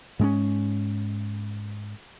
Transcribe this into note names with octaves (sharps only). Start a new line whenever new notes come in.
G#2 G#3 B3 C#4